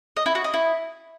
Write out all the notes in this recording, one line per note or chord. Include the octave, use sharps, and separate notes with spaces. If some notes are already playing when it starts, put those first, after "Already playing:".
D#5
E4
F#4
D#5
E4